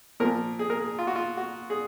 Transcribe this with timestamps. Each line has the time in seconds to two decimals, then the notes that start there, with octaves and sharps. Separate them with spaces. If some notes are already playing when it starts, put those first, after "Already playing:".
0.20 A#2 F3 A#4
0.59 G#4
0.70 A#4
0.80 G#4
0.99 F4
1.07 F#4
1.16 F4
1.37 F#4
1.70 G#4